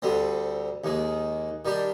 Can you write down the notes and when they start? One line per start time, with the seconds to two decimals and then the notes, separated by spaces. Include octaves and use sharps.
0.02 D2 D3 G3 C4
0.84 D#2 D#3 G#3
1.65 D#3 G3 D4 G4